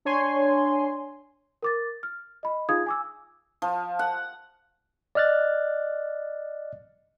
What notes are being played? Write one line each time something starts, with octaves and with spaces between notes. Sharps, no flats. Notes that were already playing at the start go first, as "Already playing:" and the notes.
D4 C#5 G#5 C6
A#4 D6 A6
F6
D#5 B5
D#4 F4 G#4 F5 D#6 G#6
G#5 D6 E6
F3
F#5
D5 D#5 F6 F#6 A6